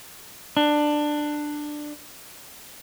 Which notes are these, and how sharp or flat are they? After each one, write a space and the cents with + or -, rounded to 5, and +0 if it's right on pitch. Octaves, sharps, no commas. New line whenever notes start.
D4 +15